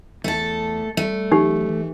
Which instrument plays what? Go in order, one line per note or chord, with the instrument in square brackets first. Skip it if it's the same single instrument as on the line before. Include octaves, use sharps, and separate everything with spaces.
[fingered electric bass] E2 [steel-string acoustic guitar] A3 A4
[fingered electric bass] G3 [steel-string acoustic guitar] A3
[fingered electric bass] E3 F#3 C#4 [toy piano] D#4 G4
[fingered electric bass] E3